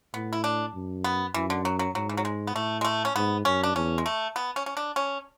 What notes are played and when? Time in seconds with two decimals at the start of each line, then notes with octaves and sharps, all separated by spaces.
0.14 A2 B3
0.33 E4
0.44 D4
0.74 F#2
1.04 B3
1.34 F#2 E3
1.50 D3
1.65 F#3
1.79 F#3
1.95 G#2 F#3
2.09 E3
2.17 F#3
2.25 G#3
2.47 B3
2.54 A2 A3
2.81 G#3
2.85 A3
3.05 C#4
3.15 G#2 B3
3.45 F#2 C#4
3.63 D4
3.75 E2 C#4
3.98 G#3
4.06 A3
4.36 B3
4.56 C#4
4.66 C#4
4.77 D4
4.96 C#4